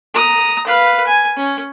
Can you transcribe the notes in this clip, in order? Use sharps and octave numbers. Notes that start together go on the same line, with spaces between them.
A#5 D#6
B4 F5
G#5
C#4